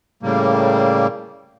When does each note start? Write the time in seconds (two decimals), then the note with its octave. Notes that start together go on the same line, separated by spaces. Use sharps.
0.23 A2 C#3 G3 A#3